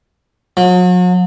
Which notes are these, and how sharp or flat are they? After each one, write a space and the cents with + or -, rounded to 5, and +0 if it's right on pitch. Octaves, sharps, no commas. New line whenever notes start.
F#3 -40